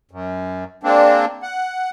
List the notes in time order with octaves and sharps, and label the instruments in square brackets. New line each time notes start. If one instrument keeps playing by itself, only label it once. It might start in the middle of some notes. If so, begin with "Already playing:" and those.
[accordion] F#2
G#3 A#3 C4 D4
F#5